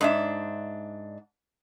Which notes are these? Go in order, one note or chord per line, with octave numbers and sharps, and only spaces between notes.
G#2 D4 E5